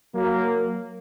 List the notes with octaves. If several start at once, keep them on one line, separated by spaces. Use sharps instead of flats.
F#3 A#3